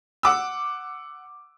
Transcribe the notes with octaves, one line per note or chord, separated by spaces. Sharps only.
F#5 D6 E6